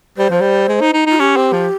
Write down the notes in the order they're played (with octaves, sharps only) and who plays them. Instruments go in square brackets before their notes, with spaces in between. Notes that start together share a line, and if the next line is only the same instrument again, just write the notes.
[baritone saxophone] G3 [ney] C5
[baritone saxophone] F3
G3
G#3
D#4
D#4
[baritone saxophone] D#4 [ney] F4
[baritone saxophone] C#4 [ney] G4
[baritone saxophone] C4
F3